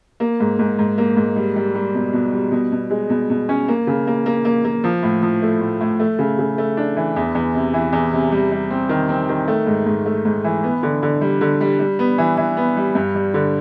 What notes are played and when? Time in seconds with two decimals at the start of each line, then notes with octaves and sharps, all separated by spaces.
0.20 A#3
0.40 G#2
0.59 G#2
0.79 G#2
0.98 A#3
1.17 G#2
1.36 G3
1.56 G3
1.75 G3
1.95 B2
2.13 B2
2.32 G3
2.52 B2
2.72 B2
2.90 G#3
3.10 B2
3.30 B2
3.49 C#4
3.68 A#3
3.87 C#3
4.07 A#3
4.26 A#3
4.45 A#3
4.65 A#3
4.84 F3
5.03 A2
5.22 F3
5.42 A3
5.61 A2
5.81 A2
6.00 A3
6.19 C#3
6.39 C#3
6.58 A3
6.77 D4
6.96 E3
7.16 E2
7.35 E2
7.55 C3
7.74 E3
7.93 E2
8.13 C3
8.32 G3
8.52 G3
8.70 C4
8.89 D#3
9.09 C4
9.29 D#3
9.48 A3
9.67 G#2
9.86 G#2
10.06 A3
10.25 G#2
10.44 E3
10.64 B3
10.83 D3
11.03 D3
11.21 G3
11.41 D3
11.61 G3
11.79 G3
11.99 B3
12.18 E3
12.37 E3
12.57 B3
12.77 G3
12.95 G2
13.15 G3
13.34 D3